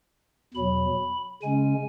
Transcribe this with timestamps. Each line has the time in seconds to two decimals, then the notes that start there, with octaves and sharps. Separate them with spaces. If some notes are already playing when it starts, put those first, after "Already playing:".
0.54 E2 B2 F#3 B5
1.43 C#3 G#3 C#4 G#5